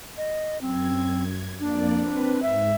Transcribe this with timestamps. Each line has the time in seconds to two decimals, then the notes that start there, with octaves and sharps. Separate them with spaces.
0.17 D#5
0.61 F#2 C4 G#6
1.60 F2 A#3 D4 D5
1.98 C4 B4
2.42 G#2 E5